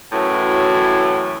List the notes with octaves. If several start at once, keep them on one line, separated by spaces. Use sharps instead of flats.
F#2 A2 E3 F#3